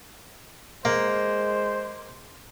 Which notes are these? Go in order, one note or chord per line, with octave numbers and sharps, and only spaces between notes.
G#3 A#3 C5